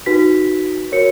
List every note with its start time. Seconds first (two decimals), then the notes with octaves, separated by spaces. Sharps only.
0.06 D#4 F#4 B4 B6
0.92 F#4 A#4 C#5 C#7